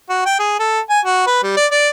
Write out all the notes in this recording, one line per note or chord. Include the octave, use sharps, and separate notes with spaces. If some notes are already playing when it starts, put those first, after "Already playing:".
F#4
G5
G#4
A4
G#5
F#4
B4
G3
D5
D5